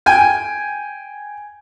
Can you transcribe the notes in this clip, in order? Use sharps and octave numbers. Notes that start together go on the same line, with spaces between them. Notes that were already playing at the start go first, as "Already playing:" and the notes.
G5 G#5